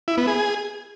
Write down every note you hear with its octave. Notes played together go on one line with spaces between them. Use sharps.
E4
B3
G#4